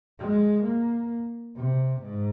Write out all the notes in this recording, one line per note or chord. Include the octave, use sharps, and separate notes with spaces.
G#3
A#3
C3
G#2